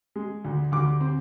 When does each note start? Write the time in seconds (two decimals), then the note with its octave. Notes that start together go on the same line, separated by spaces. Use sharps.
0.16 G#3
0.45 D2
0.72 D2 D6
1.00 C4